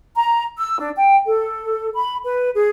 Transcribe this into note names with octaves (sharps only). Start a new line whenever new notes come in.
A#5
E6
D4
G5
A4
B5
B4
G#4